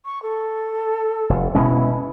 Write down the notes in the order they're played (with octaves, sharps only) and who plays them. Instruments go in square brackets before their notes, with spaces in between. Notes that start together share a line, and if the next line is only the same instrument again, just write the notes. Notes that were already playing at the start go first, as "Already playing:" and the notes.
[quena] C#6
A4
[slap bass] F1
[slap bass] B2 G#3 C#4 [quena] E4